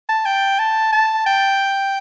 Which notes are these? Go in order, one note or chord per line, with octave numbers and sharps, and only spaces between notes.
A5
G5
A5
A5
G5